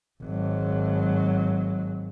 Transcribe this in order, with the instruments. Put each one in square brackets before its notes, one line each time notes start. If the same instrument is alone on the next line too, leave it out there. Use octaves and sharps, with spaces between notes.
[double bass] G#1 F#3